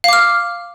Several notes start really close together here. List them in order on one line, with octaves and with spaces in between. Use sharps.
F5 D6 F6